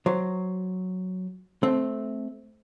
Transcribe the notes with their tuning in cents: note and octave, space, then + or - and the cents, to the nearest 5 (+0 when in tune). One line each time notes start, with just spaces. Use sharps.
F#3 +0 C5 +5
A3 -15 C4 +0